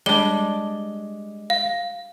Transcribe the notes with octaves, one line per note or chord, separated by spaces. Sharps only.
G3 G#3 D4 D5 G7
F5